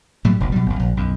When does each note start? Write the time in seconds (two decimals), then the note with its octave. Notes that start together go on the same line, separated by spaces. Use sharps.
0.25 A2 F#3 G3
0.40 F1 A#1
0.52 B2 F#3 G3
0.66 G1 C2
0.80 A#1
0.97 B1 F#2